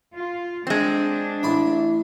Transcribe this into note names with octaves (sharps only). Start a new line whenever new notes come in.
F4
G#3 C4 D4
A1 E4 B5 C6